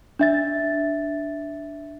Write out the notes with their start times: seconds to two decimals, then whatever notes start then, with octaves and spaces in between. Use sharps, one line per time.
0.19 D4 E5 A6